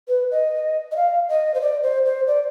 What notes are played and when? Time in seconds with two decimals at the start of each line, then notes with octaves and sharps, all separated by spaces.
0.08 B4
0.31 D#5
0.91 D#5
0.96 F5
1.29 D#5
1.54 C5
1.61 D5
1.83 C5
2.05 C5
2.27 D5